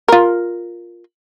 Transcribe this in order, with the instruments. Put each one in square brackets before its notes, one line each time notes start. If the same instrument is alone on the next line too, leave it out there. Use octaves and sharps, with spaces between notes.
[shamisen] F4 A#4